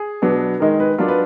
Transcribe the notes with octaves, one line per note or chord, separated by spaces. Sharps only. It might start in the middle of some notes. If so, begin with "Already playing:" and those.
Already playing: G#4
B2 F#3 B3 D4
D#3 G#3 D#4 A#4
B4
F#3 D4 F4 A#4
B4